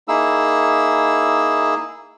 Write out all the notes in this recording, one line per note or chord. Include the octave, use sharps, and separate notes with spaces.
A#3 D#4 E4 G#4 E6